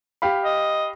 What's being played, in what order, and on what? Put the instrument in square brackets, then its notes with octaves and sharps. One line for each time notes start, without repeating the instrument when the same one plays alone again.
[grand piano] G4 F5 B5
[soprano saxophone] D#5